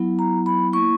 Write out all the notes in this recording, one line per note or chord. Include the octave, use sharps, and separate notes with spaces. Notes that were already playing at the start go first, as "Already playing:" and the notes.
Already playing: F#3 B3 E4
A#5
B5
A#3 E4 C#6